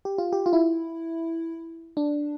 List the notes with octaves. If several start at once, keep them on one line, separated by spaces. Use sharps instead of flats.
G4
F4
G4
F4
E4
D4